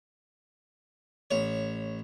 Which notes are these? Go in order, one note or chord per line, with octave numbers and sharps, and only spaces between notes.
A1 C#5